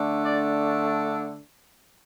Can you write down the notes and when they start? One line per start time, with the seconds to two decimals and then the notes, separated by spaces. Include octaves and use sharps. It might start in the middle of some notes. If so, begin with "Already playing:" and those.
Already playing: D3 A3 D4
0.22 D5